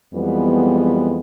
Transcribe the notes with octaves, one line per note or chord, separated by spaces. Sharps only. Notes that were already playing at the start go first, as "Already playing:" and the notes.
F2 E3 G3 G#3 B3